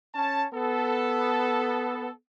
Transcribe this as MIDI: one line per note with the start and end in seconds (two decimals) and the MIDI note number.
0.14 0.45 61
0.14 0.45 81
0.53 2.10 59
0.53 2.10 69